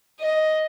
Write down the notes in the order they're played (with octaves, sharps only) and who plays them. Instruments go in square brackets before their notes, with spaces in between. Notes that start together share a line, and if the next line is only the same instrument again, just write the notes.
[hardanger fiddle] D#5